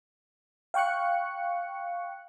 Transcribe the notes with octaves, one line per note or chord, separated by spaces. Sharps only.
F5 G5 C#6 F#6 C#7